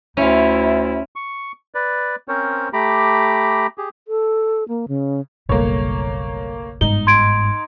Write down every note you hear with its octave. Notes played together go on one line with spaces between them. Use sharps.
D2 C#4 E4 F4
C#6
B4 D5
C4 C#4 A#4 C5 C#5
A3 G4 A#5 B5 D6
G4 G#4
A4
A#3
C#3
F#1 B1 G3 A3 A#3 C#5
G1 G#2 D#4 G7
C6 G#6 D7